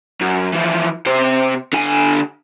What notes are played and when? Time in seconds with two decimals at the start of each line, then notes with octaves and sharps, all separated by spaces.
0.21 F#2
0.52 E3 F3
1.06 C3 C5
1.73 D3 G#5